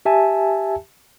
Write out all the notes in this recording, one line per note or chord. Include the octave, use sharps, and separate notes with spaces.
G4 E5 G#5 A5